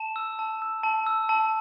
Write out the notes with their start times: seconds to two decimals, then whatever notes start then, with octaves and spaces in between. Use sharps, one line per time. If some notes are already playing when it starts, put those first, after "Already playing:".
Already playing: A5 E7
0.16 E6
0.39 A5
0.62 E6
0.83 A5
1.06 E6
1.29 A5